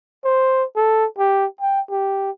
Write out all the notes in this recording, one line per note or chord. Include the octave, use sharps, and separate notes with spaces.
C5
A4
G4
G5
G4